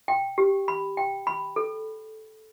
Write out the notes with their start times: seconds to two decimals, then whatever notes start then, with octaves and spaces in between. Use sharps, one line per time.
0.08 G5
0.38 G4
0.68 B5
0.97 G5
1.27 B5
1.56 A4